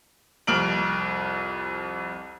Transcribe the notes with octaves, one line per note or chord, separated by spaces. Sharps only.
C2 F2 F6 D7 F#7